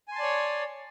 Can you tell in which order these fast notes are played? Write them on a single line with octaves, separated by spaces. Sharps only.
G#5 C6 A5 D5 C#5